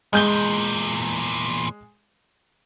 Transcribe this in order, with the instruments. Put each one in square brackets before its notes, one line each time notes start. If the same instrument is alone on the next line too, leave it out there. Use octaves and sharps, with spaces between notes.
[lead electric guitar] E2 A#2 [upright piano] G#3 G6 G7